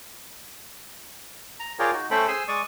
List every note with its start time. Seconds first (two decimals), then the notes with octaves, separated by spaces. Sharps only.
1.60 A#5
1.79 F4 G#4 A#4 C#5 D5 G5
1.93 D#4 F#4
2.11 A3 C#4 A4 C5 G5 B5
2.28 G#4 C5 G#5 C6 E6
2.48 G#3 D5 C#6 D#6